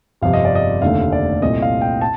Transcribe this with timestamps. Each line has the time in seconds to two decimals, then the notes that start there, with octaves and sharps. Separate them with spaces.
0.22 G1 F2 C3 F5
0.33 D#5
0.45 D5
0.55 D#5
0.82 F1 D#2 D3 A3 F5
1.12 D5
1.42 C2 A#2 A3 C4 D#5
1.62 F5
1.81 G5
2.01 A5